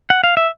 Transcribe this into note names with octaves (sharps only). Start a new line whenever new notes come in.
F#5
F5
E5